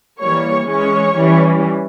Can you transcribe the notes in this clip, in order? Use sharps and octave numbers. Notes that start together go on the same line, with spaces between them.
E3 G3 A#3 C#5 C#6
E3 G#3 C#4 C#5 C#6
E3 G3 C#4